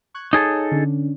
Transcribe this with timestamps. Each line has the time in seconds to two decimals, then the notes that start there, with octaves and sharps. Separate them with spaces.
0.14 C#6 F#6 G#6
0.33 D#4 G#4 A4 C#5
0.71 D3 C#4 D4